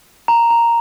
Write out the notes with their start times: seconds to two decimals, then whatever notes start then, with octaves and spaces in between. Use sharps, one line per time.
0.28 A#5
0.50 A#5